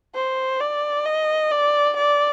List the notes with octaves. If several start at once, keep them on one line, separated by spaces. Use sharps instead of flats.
C5
D5
D#5
D5
D5